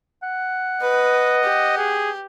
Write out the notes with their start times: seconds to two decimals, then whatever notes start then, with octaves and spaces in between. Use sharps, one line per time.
0.23 F#5
0.81 B4 D#5
1.43 G4
1.78 G#4